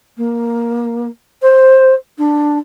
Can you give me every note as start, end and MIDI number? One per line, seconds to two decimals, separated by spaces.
0.17 1.07 58
1.42 1.94 72
2.18 2.58 62